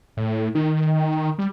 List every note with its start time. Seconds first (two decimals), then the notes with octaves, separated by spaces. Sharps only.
0.17 A2
0.55 D#3
1.38 G3